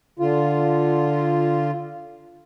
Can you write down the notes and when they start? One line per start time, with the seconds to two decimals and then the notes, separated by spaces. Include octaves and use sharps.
0.19 D3 F4